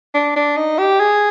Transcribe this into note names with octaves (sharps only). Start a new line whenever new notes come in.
D4
D4
D#4
G4
G#4